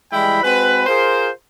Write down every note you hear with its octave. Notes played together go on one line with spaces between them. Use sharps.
E3 G3 G#3 E4 G5 B5
G#3 C4 F#4 B4
F4 G#4 A#4 C5